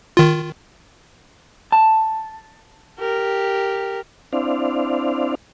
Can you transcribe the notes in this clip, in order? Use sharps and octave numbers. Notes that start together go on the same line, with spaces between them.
D#3 F4
A5
G4 A#4
C4 D4 E4 C5 D5 F5